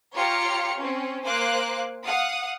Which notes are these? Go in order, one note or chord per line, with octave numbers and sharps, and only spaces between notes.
F4 G4 C#5 A#5 F6 C#7
C4 C#4
A#3 C5 F5 G#5 D6 F#6
F5 F#5 D#6